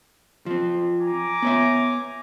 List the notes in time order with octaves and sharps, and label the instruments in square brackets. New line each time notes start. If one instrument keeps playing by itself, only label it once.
[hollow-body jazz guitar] F3 C4
[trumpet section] G#5 A#5 D6
[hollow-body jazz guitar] B3 C#5 E5